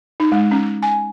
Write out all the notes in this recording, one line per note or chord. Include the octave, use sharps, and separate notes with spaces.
D#4
G#3
C#4
G#5